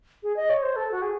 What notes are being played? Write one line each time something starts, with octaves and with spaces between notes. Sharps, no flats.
G#4
D#5
C#5
C5
A4
F#4
G#4